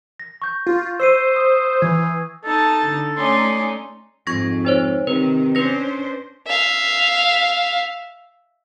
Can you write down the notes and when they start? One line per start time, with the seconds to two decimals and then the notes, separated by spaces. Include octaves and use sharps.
0.20 A#6
0.42 C#6 G6
0.66 F4
1.00 C5 E6 C7 D#7
1.36 D#6
1.82 E3 G#6
2.45 D#4 A4 A5
2.84 D3
3.17 A3 C#4 D#4 D5 C6
4.27 F2 G#2 C#6 G#6 A#6
4.65 D#4 C5 C#5
5.07 C3 D#3 B4
5.55 C#4 D4 B4 C5 A#6
6.47 E5 F5